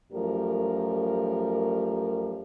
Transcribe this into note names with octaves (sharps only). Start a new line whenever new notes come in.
F#2 F3 G3 A3 A#4